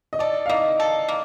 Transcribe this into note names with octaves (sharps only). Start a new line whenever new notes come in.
D#5
A4 D5
F5
A#3 D#5
A4
A#3